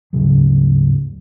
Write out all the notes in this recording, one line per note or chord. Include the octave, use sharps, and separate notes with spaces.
D2 G#2 C#3 F#3